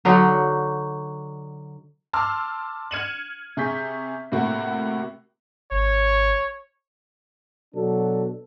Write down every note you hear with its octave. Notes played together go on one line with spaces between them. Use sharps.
D3 F#3 D#4
A5 C6 D6 E6 F6
F6 G#6 C#7 D#7 E7 F#7
C3 G#4 C#6 G6 B6
A2 C3 A#3 F#4
G#1 C#5
B2 F#3 D4 A4